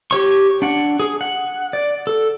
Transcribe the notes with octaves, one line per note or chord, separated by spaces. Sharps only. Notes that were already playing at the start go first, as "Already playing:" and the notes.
G4 C#5 C#6
D4 F#5
G#4
F#5
D5
A4